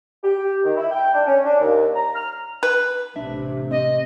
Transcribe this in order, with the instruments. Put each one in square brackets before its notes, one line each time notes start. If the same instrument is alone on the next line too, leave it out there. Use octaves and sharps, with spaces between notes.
[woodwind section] G4
D#3
E4
G5
D4
C#4
D4
D#2
A#5
F6
[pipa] B4
[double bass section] A1 C3 [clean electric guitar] D4 E5
[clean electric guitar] C4 [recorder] D#5